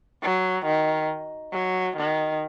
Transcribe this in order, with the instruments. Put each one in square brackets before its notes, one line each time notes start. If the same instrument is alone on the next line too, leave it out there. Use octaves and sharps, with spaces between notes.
[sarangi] F#3
D#3
F#3
D#3